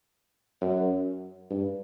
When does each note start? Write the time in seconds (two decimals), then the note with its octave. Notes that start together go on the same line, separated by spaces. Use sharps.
0.61 F#2
1.50 G2